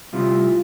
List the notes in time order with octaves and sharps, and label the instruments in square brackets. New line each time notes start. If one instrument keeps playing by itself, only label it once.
[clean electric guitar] C3 G3 C4 E4 F4